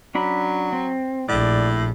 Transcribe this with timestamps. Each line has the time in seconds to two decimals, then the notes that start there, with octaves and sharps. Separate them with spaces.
0.15 F#3 C#4 D4 B5
0.73 C4
1.29 A#1 A2 D5